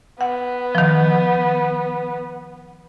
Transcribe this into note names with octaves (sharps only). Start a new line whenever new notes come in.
B3 F#5
D#3 F3